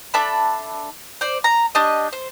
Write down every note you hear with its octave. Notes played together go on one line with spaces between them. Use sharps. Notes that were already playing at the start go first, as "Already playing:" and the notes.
D4 A4 E5 B5
C5 D5
A#5
D4 G4 D#5
C5